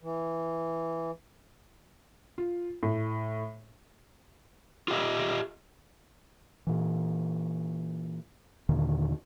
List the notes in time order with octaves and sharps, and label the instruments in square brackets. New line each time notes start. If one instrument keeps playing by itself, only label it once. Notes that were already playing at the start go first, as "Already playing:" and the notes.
[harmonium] E3
[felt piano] F4
A2
[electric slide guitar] F4 G4 D#5 E5
[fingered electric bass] A#2 E3
D#2 A#2 D3 D#3